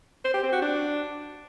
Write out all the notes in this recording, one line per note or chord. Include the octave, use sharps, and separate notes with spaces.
C5
G4
C4
F#4
D4